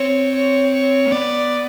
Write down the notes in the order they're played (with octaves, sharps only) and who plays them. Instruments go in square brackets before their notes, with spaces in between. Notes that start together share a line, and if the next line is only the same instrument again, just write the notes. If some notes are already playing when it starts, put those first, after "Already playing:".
Already playing: [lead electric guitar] C4 [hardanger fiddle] C#5
[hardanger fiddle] C#5
C#5
[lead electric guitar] A#3
[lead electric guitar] B3 [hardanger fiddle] D5